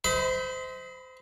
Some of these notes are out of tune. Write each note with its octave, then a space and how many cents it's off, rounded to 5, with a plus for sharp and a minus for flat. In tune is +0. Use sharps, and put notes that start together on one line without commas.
C5 -25 D#5 +40 B5 +20